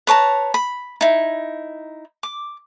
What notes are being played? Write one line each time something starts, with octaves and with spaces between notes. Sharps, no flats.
B4 C#5 A5 A#5
B5
D#4 E4
D6